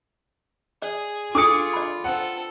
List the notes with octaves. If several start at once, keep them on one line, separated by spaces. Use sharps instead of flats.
G#4 D5
D4 F4 A4 D6 D#6 C#7
D5 B5
C4 A4 F#5